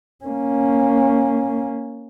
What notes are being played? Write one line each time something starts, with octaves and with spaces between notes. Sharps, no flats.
A#3 C#4